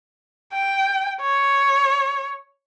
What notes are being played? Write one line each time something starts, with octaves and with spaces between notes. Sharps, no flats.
G5
C#5